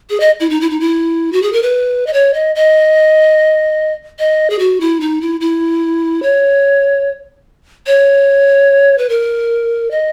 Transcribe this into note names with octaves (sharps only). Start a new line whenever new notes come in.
G#4
D#5
E4
D#4
E4
D#4
E4
F#4
G#4
A#4
B4
D#5
C#5
D#5
D#5
D#5
G#4
F#4
E4
D#4
E4
E4
C#5
C#5
B4
A#4
D#5